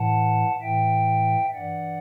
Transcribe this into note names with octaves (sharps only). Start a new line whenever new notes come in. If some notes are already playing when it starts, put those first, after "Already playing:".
Already playing: A2 E3 F#5 A5
A2 E3 E5 G5
G2 E3 D5 F#5